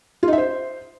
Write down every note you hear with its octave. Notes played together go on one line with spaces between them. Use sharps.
F4
D#4
E5
C5